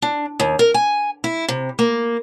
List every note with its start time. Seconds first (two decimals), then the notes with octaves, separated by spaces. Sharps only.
0.02 D4
0.40 D#2
0.59 A#4
0.74 G#5
1.24 E4
1.48 C3
1.79 A#3